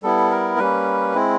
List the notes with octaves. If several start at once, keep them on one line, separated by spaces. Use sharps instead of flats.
G3 B3 E4 A4
A#4
G3 A#3 C#4 B4
G#3 C4 E4